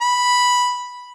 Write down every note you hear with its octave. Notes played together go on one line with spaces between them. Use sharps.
B5